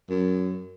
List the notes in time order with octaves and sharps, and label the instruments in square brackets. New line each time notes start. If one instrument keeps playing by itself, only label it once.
[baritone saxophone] F#2